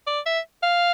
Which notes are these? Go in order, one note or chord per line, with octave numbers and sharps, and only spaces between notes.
D5
E5
F5